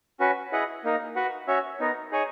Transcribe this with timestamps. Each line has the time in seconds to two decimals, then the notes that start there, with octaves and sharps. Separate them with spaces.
0.20 C#4 F#4 B4
0.52 E4 G#4 B4 D#5 F#5
0.84 A#3 D#4 A#4
1.16 F#4 B4 F#5
1.47 C#4 F#4 C#5 E5
1.80 B3 D#4 A#4
2.11 D#4 G#4 C#5 G#5